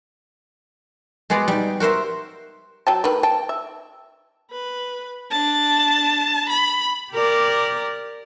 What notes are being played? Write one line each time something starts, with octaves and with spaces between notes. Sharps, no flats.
G#3 B3 F#4 G#4 D5
G3 D#4
F#4 A#4 C5 E5
F#3 G5 A5
D#3 A3 B4
G5 A5
E5
B4
D4 A5
B5
G4 A#4 D5